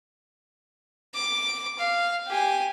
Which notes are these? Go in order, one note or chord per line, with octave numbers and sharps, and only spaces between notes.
D6
F5
G4 G#5